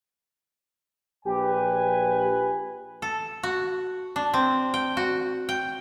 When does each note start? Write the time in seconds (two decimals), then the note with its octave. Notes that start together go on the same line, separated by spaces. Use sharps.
1.25 A#1 G4 B4 G#5
3.02 A4
3.43 F#4
4.16 D4
4.34 C4
4.74 G5
4.97 F#4
5.49 G5